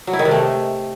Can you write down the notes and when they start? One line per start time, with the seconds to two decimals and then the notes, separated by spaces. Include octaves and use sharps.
0.07 F#3
0.13 E4
0.19 D#3
0.25 C3
0.31 A3